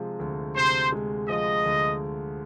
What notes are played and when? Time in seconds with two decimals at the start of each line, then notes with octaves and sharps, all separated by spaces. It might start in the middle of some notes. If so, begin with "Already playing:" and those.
Already playing: C3 F3 G#3
0.19 D2
0.56 C3 C5
0.92 G#3
1.29 F3 D#5
1.66 D2